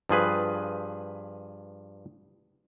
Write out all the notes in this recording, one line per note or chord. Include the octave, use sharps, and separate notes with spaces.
G2 F3 G#4 B4